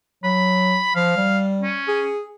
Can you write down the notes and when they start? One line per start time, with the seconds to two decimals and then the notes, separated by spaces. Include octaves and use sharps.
0.24 F#3 B5
0.96 F3 F5
1.17 G3
1.61 C#4
1.88 G#4